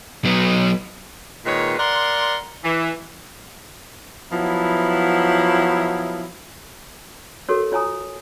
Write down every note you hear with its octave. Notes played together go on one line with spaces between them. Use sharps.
F#3 B3
A#2 D#3 G#3 B4 C#5
A#4 D5 F#5 C6
E3
F3 F#3 B3 E4
F#4 A4 A#4 C#5
F4 C#5 G#5 A#5 D#6